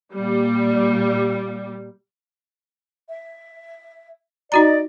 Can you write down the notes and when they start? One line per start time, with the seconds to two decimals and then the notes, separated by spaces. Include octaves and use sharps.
0.13 A#2 G3
3.09 E5
4.52 D#4 F#4 D5 D#5 A#5